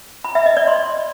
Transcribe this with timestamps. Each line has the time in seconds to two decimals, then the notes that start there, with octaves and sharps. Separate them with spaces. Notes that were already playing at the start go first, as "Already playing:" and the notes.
0.24 B5
0.35 E5
0.46 D#5
0.57 D5
0.67 C6